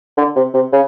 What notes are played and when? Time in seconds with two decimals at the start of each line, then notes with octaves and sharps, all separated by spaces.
0.17 D3
0.36 C3
0.54 C3
0.73 C#3